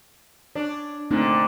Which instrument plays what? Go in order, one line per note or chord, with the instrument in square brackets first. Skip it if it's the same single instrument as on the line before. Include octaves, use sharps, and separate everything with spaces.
[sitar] D4 [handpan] C#5
[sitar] A#2 D3 [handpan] A3 C4 D#4